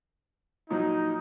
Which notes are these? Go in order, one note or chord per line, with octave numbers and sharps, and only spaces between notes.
A#2 F3 F#3 D#4